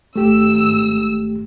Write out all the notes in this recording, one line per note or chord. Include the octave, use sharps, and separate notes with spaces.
G#1 A3 G4 E6